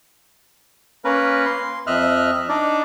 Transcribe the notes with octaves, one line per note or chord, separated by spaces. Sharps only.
A#3 C#4 A#4 B4
C6
F2 D#5 E5 F6 F#6
D4 D#4 D5